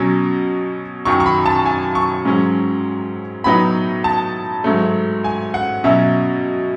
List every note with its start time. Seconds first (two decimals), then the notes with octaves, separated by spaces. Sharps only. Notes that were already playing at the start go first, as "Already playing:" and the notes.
Already playing: B2 F#3 C#4
1.05 F#2 D#3 F#3 C#6
1.20 C#6
1.26 B5
1.46 A5
1.66 G#5
1.95 C#6
2.25 G#2 F#3 C#4
3.44 A2 F#3 B3 D#4 B5
4.04 A5
4.64 G#2 F#3 A3
5.24 G#5
5.54 F#5
5.84 B2 F#3 C#4 E5